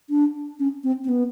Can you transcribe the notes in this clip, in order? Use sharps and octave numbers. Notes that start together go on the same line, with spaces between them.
D4
C#4
C4
C4
B3